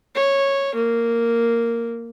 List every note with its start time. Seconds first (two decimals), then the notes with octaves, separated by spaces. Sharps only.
0.15 C#5
0.75 A#3